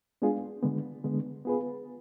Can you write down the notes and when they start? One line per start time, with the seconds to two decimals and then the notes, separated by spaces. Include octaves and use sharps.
0.22 G#3 B3 D4 F4 G#4
0.62 D3 G#3 B3
1.04 D3 G#3 B3
1.45 B3 F4 G#4 B4